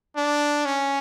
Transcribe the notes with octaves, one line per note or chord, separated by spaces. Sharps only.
D4
C#4